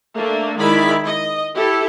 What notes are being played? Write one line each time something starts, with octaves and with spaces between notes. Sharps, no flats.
A3 A#3 D4
D#3 G#3 E4 D5 B5
D#5
E4 G4 A4